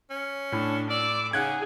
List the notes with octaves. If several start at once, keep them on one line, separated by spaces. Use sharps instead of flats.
C#4
A2 D4
D5 D6 E6
C#3 D#4 G#4 F#5 F#6 G#6